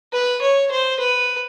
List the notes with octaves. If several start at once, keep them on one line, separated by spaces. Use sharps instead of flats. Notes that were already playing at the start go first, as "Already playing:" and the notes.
B4
C#5
C5
B4